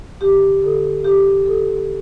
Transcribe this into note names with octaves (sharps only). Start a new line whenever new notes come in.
D3 G4
D3 A4
D2 G4
D2 A4